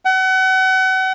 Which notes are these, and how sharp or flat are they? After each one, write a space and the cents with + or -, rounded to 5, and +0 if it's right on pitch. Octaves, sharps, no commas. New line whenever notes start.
F#5 +35